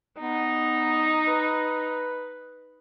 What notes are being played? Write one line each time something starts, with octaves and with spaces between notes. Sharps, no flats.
B3 D#4
B4